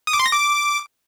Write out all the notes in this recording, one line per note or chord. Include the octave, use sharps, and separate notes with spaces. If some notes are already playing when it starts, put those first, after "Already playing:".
D#6
D6
C6
A#6
D6